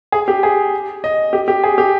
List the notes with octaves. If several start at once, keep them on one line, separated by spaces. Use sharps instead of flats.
G#4
G4
G#4
D#5
G4
G4
G#4
G4